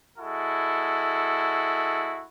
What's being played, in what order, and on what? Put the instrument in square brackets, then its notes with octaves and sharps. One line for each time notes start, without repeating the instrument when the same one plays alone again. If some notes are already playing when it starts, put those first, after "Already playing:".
[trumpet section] G#3 E4 F#4 A4